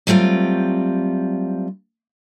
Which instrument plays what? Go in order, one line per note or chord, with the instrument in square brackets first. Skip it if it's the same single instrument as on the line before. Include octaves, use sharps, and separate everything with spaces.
[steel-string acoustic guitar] F#3 G3 A3 C4 F4